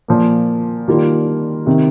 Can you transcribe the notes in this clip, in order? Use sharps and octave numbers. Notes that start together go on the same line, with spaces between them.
A#2 F3 A#3
D#3 G3 A#3 F4
C3 D#3